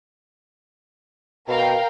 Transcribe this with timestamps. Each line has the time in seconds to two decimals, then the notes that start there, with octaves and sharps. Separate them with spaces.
1.48 B2 A#4 F5 G5